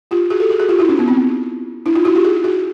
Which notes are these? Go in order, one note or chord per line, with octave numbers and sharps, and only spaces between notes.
F4 G4
F#4 G#4
G4 A4
F#4 G#4
F#4 G#4
F4 G4
E4 F#4
C#4 D#4
B3
C4
D4 E4
D#4 F4
E4 F#4
F4 G4
F#4 G#4
F#4 G#4